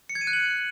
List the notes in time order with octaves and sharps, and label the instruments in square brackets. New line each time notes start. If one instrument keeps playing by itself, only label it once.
[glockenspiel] C#7
G#6
D#7
F#6
F#7